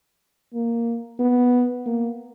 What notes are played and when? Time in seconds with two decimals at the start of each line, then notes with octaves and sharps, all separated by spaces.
0.54 A#3
1.20 B3
1.86 A#3